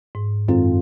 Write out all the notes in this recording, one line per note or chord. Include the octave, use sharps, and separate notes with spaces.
G#2
F#2 D#3 G#3 C4 F4 A4